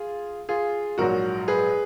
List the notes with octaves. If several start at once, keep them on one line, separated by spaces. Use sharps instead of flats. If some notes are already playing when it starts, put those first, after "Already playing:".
Already playing: F4 G#4
F4 G#4
A#1 G#2 F#3 F#4 A#4
G#4 B4